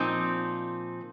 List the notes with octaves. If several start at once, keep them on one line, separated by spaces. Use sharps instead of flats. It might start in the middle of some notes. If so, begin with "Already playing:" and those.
Already playing: A#2 F3 C4 D#4